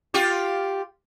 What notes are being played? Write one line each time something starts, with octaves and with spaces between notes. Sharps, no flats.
F4 G4